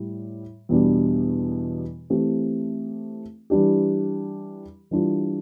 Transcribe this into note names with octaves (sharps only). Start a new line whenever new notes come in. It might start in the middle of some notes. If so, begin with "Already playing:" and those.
Already playing: A2 G3
E2 B2 G3 D4
E3 A3 C4 G4
E3 G3 D4 G4
E3 G3 D4 F4